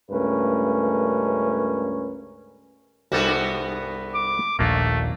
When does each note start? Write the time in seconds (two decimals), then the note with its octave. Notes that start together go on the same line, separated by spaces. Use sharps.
0.10 C#2 G2 A3 C#4 A#4 B4
3.12 C2 G2 G3 B3 F#4 A4
4.14 D6
4.59 D#1 A#1 A3 A#3 D4